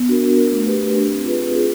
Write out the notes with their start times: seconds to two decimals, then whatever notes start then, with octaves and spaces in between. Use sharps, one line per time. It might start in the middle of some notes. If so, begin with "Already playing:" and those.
Already playing: B3
0.08 D4 F#4 A#4
0.22 B3
0.37 D4 F#4 A#4
0.52 A3
0.66 D4 G4 B4
0.81 A3
0.96 D4 G4 B4
1.10 C4
1.24 F4 G#4 B4
1.39 C4
1.54 F4 G#4 B4